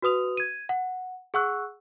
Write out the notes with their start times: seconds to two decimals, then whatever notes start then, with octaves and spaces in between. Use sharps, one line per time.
0.03 F#4 B4 D#6 F7
0.37 G#6 D#7
0.69 F#5
1.34 G#4 F#5 C#6 E6 F#6